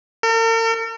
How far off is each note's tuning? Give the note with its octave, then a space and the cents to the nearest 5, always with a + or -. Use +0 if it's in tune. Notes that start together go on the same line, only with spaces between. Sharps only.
A#4 -45